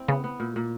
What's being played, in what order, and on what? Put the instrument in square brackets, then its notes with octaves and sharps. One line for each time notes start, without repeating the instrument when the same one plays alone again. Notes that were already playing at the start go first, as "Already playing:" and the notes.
Already playing: [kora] C4 E4
[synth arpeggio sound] C#3 [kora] B3
[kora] B3
A#2
A#2